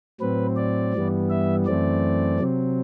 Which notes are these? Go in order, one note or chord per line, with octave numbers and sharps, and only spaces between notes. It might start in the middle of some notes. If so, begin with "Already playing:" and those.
A2 F#3 C4 B4
D5
G2 E3 G3 B3
E5
F#2 E3 A3 C4 D5
C3 F#3 C4